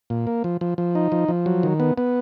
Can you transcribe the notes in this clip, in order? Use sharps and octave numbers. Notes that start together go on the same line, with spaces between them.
A#2
A#3
F3
F3
F3
D#4
F3
F3
F#3
D#3
B3
B3